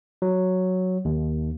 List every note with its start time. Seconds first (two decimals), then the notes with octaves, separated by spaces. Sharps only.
0.22 F#3
1.05 D#2